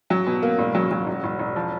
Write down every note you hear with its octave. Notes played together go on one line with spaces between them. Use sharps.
F#3
B2
A#3
E1
F#3
F#3
E1
E1
E1
F3